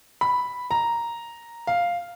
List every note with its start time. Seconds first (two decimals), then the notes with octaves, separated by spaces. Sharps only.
0.21 B5
0.71 A#5
1.67 F5